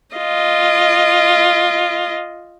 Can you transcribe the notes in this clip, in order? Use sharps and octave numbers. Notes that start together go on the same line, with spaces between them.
F4 D#5